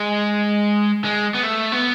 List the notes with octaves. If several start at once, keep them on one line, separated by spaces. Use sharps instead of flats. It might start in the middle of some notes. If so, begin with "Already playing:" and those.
Already playing: G#3
G#3
B3
A3
B3